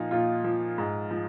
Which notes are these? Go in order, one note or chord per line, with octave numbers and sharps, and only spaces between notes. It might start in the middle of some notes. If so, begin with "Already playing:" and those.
Already playing: A#2 F3 D#4
A#2 F4
F3
G#2
F3